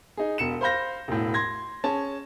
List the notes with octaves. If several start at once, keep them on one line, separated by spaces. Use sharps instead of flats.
D#4 G#4
E1 C#7 E7
C5 F5 B5 G6 A#6
E1 A2
C6 G#6 A#6
C#4 G#4 A5